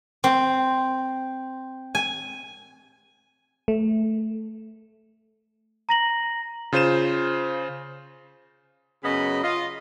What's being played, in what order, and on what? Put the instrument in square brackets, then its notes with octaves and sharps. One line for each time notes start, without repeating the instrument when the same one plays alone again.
[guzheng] C4
G#5
[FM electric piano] A3
[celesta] A#5 A#6 F#7
[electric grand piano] C#3 F4 C5 D#7 E7
[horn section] F#2 C#3 B3 D#5 B5
F4 D#5